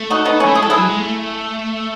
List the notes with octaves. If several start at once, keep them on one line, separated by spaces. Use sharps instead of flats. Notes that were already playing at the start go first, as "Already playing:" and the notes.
Already playing: A3
D#4 F#4
B3 D#4
C#4 E4
A3
G#3 G#4
A4
E3 E4 G#4
F#3
G#3
A3